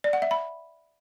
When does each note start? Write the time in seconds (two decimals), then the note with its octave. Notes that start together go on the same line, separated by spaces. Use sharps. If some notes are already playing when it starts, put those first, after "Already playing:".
0.04 D5
0.13 F#5
0.22 E5
0.31 B5